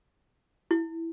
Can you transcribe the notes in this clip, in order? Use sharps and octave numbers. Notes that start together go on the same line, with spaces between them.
E4